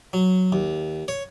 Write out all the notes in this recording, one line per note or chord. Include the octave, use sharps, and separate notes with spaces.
F#3
D#2
C#5